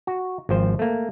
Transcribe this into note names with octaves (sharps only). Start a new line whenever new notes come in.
F#4
G#1 F3 C5
A3 A#3